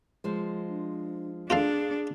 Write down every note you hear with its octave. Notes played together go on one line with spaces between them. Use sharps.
F3 G#3 C5
D4
D4 F4 G#4 A4 F5